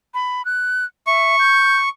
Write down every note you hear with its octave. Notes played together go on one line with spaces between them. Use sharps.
B5
F#6
E5 C#6
G6